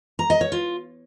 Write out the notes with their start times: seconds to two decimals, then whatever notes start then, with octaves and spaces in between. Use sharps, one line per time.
0.19 A#5
0.30 D#5
0.41 C#5
0.52 F4